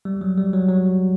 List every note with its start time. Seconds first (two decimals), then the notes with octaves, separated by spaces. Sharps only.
0.05 G3
0.21 F#3
0.37 G3
0.53 F#3
0.68 F#3